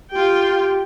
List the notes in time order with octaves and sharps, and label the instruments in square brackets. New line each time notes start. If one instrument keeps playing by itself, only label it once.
[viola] F4 G5 [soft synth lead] G4